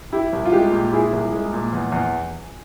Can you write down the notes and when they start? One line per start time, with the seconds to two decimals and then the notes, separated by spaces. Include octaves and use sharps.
0.13 E4 G4
0.33 C2
0.45 F4
0.52 G#3 G4
0.72 A#2
0.92 E4 G#4
1.13 C2
1.32 G#3
1.53 A#2
1.73 E2
1.92 E2